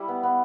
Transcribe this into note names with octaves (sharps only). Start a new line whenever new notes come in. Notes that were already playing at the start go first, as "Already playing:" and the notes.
Already playing: G3 E4
B3
B3